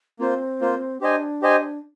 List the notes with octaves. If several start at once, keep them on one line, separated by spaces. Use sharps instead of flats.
A#3 C4 F4 C5
A#3 F4 C5
D4 G4 C5 D#5 G#5
G4 C5 D#5 G#5